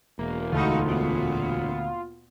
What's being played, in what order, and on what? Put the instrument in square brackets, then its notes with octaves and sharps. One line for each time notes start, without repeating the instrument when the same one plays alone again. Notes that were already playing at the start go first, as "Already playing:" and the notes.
[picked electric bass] E1 [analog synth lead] A#3
[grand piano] D2 A4 B5 [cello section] G#3 D#4 F#4 [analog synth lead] F4
[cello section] A#2 B3